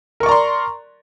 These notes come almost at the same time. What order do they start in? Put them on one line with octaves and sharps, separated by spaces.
A#4 C#6 D5 A#5 C6